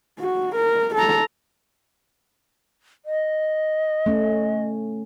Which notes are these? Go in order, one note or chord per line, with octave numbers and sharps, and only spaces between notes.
F#4
A#4
A4 A#5
D#5
A3 C#4